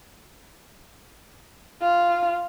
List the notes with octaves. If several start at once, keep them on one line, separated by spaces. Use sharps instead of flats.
F4